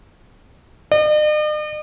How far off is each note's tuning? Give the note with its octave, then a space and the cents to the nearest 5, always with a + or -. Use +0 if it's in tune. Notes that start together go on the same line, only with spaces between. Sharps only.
D#5 -45